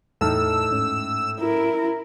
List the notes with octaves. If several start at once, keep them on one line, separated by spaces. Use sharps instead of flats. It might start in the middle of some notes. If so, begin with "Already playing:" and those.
E2 A2 D#4 A5 E6 F6
G#2 C#4
E4 A#4